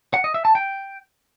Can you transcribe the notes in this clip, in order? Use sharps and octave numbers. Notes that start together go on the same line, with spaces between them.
F#5
D#5
E5
A5
G5